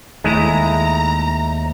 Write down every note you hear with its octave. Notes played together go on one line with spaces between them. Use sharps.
D#2 D#3 G#3 A3 E4 A#5